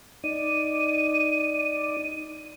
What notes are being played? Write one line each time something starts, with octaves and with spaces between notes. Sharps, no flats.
D#4 D5 D#7